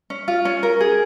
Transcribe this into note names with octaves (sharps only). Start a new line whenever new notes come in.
C#4
F4
C#4
A#4
G#4